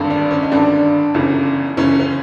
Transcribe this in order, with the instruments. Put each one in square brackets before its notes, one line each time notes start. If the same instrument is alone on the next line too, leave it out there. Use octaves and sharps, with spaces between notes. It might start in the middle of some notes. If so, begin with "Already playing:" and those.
Already playing: [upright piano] G#1 G2 D3
D4
C#4
D#4
G#1 G2 D3 D4
G1 F#2 C#3 E3
G1 F#2 C#3 E3 C#4
C#4